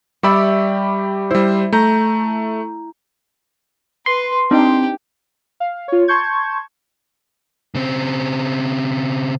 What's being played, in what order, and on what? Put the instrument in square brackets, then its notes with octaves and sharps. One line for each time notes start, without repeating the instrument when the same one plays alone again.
[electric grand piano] G3 G4 B5 [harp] D5 E5 C#6
[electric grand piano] G3 C5 [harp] E4
[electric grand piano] A3 [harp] A#5 G6
[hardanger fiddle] B4 [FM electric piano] C6
[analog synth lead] C4 [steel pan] D4 D#4 [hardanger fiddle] G4
[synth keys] F5
F4 C#5
A5 C6 C#6 G6 G#6
[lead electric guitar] C#3 C4